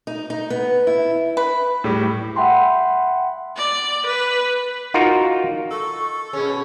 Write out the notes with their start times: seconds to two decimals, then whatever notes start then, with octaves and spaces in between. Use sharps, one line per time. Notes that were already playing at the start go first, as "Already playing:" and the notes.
0.07 D#4
0.30 D#4
0.50 B3
0.87 E4
1.37 B4
1.84 A2 G3 G4
2.36 E5 F#5 G5 B5 C6
3.57 D5
4.06 B4
4.94 D#4 F4 F#4 A#4
5.71 A4 C#6
6.33 B2 C#4 G#4